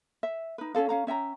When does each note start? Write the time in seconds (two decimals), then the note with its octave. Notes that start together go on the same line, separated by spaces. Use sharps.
0.23 E5
0.58 D#4 B4
0.75 C#4 D4 A4 F5
0.89 C#4 F5 A#5
1.07 C#4 E5 G5 A#5